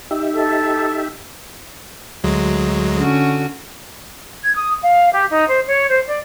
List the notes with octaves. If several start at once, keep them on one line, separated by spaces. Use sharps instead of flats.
D#4 G4 E5
A4
D2 F#3 G#3
D3 C#4 F#4
G#6
D#6
F5
G4
D#4
C5
C#5
C5
D5